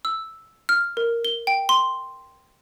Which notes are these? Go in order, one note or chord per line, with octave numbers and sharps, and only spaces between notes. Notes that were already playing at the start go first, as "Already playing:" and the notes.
E6
F6
A#4
G7
G5
C6